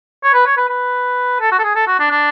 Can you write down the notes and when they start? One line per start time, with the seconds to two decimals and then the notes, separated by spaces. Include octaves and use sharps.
0.24 C#5
0.34 B4
0.46 C#5
0.57 B4
0.69 B4
1.40 A4
1.52 F#4
1.59 A4
1.64 G#4
1.75 A4
1.87 F#4
1.99 D4
2.11 D4